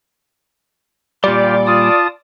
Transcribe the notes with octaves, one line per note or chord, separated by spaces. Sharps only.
A#2 G3 F4 G4 D5
F4 A5 D#6